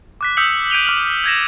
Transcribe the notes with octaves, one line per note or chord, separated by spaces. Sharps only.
D6 F#6 B6
D#6 E6 G6 B6 C#7 F#7
G6 D7 D#7 F7 G7
D6 F6 F#7
G6 G#6 A#6 E7